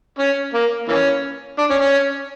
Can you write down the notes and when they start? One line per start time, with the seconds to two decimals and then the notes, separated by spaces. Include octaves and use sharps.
0.19 C#4
0.54 A#3
0.88 E3 A#3 C#4
1.59 D4
1.70 C#4
1.81 C#4